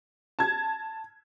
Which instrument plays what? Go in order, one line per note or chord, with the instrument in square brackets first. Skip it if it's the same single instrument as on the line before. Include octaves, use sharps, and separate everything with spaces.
[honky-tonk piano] A5 G#6